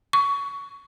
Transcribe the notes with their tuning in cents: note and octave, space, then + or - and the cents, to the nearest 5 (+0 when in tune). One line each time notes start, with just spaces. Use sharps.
C#6 +25